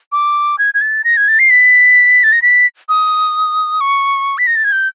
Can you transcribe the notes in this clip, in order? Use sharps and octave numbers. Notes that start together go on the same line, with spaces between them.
D6
G#6
G#6
A6
A#6
G#6
A6
C7
B6
A6
A#6
B6
D#6
C#6
B6
A#6
A6
G#6
G6